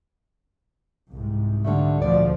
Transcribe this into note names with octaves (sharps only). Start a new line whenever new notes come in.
C2 G#2
D3 G3 A3
D2 A#2 F3 D5